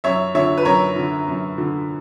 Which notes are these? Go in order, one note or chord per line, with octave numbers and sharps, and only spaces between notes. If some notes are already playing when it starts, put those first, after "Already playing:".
F#2 C#5 E5
D3 C#5 E5
B4
F#2 A#4 C#5
D3
F#2
D3